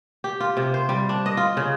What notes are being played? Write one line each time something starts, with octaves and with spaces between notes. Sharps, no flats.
G4
F4
C3
C5
G3
D4
D#5
F4
C#3